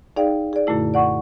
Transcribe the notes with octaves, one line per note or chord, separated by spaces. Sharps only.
D#4 G#4 D5 F5 G5
G#4 D5
F#2 A#2 D3 A3 E4
D5 F#5 C#6